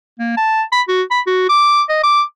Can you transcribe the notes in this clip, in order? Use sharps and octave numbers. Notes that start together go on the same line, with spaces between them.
A#3
A5
B5
F#4
B5
F#4
D6
D#5
D6